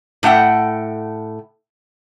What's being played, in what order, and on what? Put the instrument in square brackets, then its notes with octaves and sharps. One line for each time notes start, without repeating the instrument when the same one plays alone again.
[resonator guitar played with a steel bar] A2 A3 F#5 G5